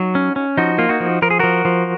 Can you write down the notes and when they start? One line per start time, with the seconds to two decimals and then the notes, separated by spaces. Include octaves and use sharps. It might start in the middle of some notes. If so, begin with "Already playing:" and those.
Already playing: F#3 D#4 F#4
0.15 C#4
0.36 C#4
0.57 F3 D#4 F#4
0.78 A#3 F4
0.89 D#4 F#4
1.00 F3
1.22 F3 A#4
1.30 G#4
1.39 F3 F#4 A#4
1.65 F3